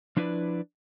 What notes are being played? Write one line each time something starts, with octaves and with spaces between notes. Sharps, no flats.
F3 D4 E4 B4 D5